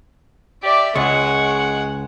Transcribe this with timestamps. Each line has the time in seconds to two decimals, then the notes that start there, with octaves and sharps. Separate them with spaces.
0.63 G4 D5 E5
0.95 C#2 G#3 F#5 C#6